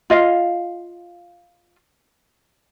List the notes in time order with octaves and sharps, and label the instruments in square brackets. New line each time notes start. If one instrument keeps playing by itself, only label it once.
[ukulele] F4 D#5 F5